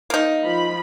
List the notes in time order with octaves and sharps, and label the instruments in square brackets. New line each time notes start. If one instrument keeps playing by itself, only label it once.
[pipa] A#3 D#4
[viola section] F3 B5